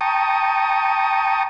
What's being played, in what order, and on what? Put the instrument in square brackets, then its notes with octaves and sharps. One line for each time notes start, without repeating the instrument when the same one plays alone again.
[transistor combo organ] G5 A5 A#5 C#6 D#6